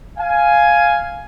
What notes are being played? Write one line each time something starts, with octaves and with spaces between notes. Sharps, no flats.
F5 G#5